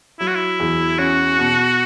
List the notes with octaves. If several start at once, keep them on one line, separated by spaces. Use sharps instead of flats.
F#3 E4
F#4
E4
E2
C#4 F#4
B2